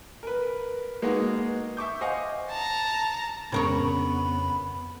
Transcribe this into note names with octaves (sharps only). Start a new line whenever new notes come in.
A#4 B4
G#3 A#3 B3 D#4 F#4
E5 C#6 D6 G6
C5 D#5 F5 F#5 G#5
A5 A#5
F2 C#3 B3 A#4 C#5 B5